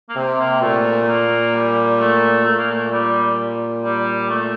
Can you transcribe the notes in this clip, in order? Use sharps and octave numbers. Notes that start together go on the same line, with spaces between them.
A#3
C3 C4
A#3
A#2 A3
A3
A#3
G3
A3
A#2 A3
A#3
A3
G3
G3
A3